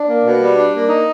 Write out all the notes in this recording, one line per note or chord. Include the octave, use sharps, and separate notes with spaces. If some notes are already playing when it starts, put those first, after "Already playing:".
Already playing: D4
A#3
B2
G3
D4
A#3
D#4